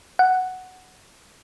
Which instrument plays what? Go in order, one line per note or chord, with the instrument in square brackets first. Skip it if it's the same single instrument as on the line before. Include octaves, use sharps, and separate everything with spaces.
[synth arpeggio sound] F#5